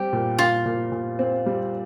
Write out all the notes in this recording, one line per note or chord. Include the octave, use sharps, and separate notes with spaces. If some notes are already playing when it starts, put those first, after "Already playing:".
Already playing: G3 C4 G4
A#2
A#2 F4
A#2
A#2
C4
G3